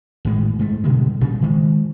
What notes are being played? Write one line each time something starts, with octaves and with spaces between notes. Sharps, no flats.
G#1 A2 G#3
G#2 A3
B2 D3 G3 G#3
G2 A#2 C#3 G3
D#3 G#3